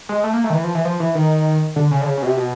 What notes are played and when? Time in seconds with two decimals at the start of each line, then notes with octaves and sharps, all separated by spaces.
0.09 G#3
0.24 A3
0.34 A#3
0.44 A3
0.50 D#3
0.54 E3
0.64 F3
0.75 E3
0.85 F3
1.00 E3
1.15 D#3
1.76 D3
1.91 C#3
2.01 D3
2.06 C#3
2.17 C#3
2.23 B2
2.27 C3
2.37 B2